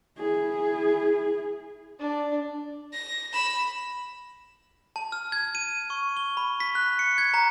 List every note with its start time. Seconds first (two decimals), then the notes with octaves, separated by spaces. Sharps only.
0.18 E4 G#4
1.99 D4
2.93 A#6
3.33 B5 E7
4.96 A5
5.12 F6
5.32 G#6
5.55 D#7
5.90 C#6
6.17 G7
6.37 B5
6.60 B6
6.75 F#6
6.99 C#7
7.18 G#6
7.34 A#5